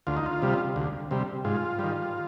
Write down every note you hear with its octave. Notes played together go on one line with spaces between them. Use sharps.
D2 F4
D#4
F4
C3 G3
D2
C3 G3
G#2 F4
D#3 G3